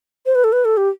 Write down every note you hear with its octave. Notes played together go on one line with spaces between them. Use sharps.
C5
B4
A4
B4
A4
G4